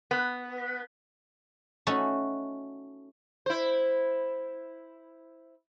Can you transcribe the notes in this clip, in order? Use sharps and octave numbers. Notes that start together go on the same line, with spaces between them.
B3
A3 C#4 D#4 F#4 A4
E4 C5